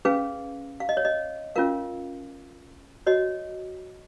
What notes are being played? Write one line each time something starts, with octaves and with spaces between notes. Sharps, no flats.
C#4 G#4 B4 F5
F5
D#5
C#5
D#5
C#4 F4 A#4 F5
F#4 C#5 D#5